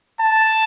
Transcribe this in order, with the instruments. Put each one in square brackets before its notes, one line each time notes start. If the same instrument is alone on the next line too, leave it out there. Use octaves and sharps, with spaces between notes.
[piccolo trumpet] A5